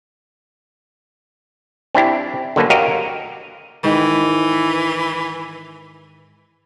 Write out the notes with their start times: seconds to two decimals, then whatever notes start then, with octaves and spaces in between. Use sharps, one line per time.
1.95 C4 D4 E4 G4
2.56 D3 F#3 A#3 A4 B4
2.70 F#4 G4 A#4 C#5 D#5 F5
3.84 G#2 D#3 E3 G5